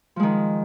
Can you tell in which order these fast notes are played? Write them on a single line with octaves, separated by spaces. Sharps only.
F3 G#3 D#3